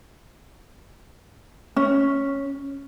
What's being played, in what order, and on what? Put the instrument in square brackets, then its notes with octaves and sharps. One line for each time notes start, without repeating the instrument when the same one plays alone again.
[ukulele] C#4